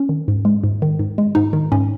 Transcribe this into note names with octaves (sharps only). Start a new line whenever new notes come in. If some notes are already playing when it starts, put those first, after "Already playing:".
Already playing: C#4
D#3
G#2
G#3
G#2
D#3
G#2
G#3
G#2 D#4
D#3
G#2 C#4